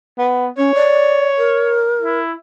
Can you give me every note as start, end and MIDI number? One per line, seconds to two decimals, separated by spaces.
0.18 0.47 59
0.58 0.71 61
0.58 1.91 73
0.74 1.26 74
1.38 2.19 70
2.01 2.34 64